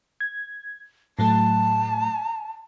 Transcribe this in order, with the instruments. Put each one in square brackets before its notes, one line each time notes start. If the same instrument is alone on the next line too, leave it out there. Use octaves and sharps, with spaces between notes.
[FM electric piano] G#6
[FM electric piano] A2 F#3 A3 [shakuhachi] A5